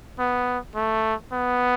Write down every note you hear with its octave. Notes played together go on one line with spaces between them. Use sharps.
B3
A3
B3